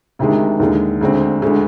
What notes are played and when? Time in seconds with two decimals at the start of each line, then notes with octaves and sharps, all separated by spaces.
0.19 D2 C3 D#3 G#3
0.60 D#2 D3 G#3
1.01 D2 D3 G#3 C4
1.42 D2 D3 G#3